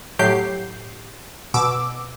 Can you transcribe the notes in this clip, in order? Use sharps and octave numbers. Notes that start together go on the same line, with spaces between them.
A2 F#3 G4 G6 C7
B2 D6 E6